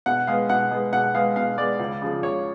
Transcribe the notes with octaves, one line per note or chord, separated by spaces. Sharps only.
B2 F#5
G#3 B3 F5
B2 F#5
G#3 B3
B2 F#5
G#3 B3 F5
B2 F5
G#3 B3 D5
C#2
C#3 F3
C#2 C#5